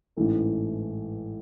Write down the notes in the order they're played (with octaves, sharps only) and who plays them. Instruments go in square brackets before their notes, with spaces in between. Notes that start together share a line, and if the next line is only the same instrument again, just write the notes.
[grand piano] A1 G#2 E3 A3